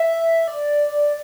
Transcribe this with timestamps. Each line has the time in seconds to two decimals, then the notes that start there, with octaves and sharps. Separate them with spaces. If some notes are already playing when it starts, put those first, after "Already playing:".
Already playing: E5
0.48 D5